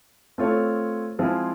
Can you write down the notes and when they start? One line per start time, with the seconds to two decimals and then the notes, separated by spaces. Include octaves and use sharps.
0.38 A3 C4 F4 A4 C#5
1.19 F3 G#3 C4 E4 G#4